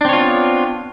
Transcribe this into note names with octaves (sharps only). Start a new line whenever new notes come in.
B3 C4 D4 F4 C#5